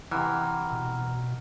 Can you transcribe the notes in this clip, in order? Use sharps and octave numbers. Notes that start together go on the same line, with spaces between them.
C3 E3 F#5 A#5 F6
B2